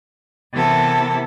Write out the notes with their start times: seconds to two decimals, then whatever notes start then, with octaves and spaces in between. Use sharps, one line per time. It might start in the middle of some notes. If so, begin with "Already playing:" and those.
0.51 C3 E3 B3 E4 A4 A#4